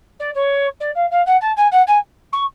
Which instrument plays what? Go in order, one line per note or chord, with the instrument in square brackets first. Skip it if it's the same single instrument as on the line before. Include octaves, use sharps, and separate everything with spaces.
[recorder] D5
C#5
D5
F5
F5
F#5
A5
G#5
F#5
G#5
C#6